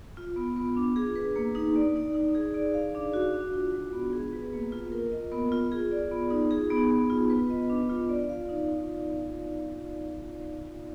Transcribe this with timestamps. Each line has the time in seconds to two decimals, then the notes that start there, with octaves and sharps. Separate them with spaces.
0.17 F4
0.36 B3
0.56 B3
0.76 D4
0.96 G#4
1.16 B4
1.36 A#3
1.55 D#4
1.76 D5
1.96 D#4
2.14 D#4
2.35 G#4
2.54 D5
2.74 F5
2.95 D4
3.13 F#4
3.34 D4
3.53 F4
3.74 G#3
3.93 B3
4.13 G#4
4.33 B4
4.53 A#3
4.72 F4
4.92 A#4
5.12 D#5
5.32 B3
5.52 F4
5.72 G#4
5.91 D5
6.11 B3
6.30 D#4
6.51 G#4
6.70 B3
6.91 B3
7.10 F4
7.30 B4
7.50 D#5
7.70 D4
7.89 F4
8.09 D5
8.29 F5
8.49 D#4